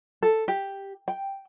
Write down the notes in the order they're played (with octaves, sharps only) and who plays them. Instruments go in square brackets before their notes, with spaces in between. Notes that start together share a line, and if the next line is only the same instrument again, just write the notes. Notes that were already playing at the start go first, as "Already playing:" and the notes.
[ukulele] A4
G4
G5